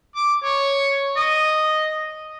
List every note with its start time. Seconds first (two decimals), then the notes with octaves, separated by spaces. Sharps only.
0.15 D6
0.44 C#5
1.17 D#5